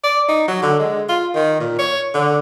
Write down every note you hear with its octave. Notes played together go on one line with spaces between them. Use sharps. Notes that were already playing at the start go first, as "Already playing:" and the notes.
D5
D#4
F#3
D3
G#3
F4
D#3
A#2
C#5
D3